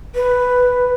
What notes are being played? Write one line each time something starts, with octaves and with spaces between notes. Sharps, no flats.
B4